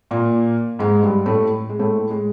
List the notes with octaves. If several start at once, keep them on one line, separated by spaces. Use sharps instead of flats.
A#2 A#3
G#2 G#3
G2 G3
A2 A3
G#3
A2 A3
G#3